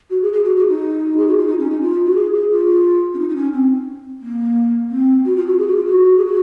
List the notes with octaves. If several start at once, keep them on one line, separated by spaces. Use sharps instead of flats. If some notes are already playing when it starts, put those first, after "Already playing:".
F#4
G#4
G#4
F#4
F#4
D#4
G#4
F#4
F4
D#4
C#4
D#4
F4
F#4
G#4
G#4
F4
C#4
D#4
D#4
C#4
C4
A#3
C4
F#4
F4
F#4
G#4
F#4
F4
F#4
G#4
F#4